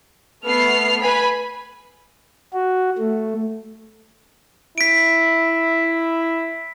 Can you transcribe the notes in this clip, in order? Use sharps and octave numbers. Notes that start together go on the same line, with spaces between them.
A3 B3 F6 C7
B4 G#5 B5
F#4
A3
E4 B6 D7